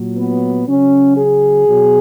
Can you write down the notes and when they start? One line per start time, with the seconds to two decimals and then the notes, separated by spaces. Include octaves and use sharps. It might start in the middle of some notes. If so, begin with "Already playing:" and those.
Already playing: A#2 F#3
0.17 B3
0.67 C#3 F#3 C#4
1.17 G#4
1.67 B2 F#3